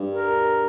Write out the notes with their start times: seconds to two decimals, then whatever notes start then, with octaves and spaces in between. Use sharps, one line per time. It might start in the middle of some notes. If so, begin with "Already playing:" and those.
Already playing: G2
0.10 A#4